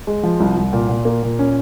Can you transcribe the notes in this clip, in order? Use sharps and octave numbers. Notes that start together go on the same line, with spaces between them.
G#3
F3
C2
C2
A#2
A#2
A#3
A#2
C#4